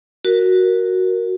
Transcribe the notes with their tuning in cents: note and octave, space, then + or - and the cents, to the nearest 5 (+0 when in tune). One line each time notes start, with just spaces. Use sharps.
F#4 +0 A#4 +0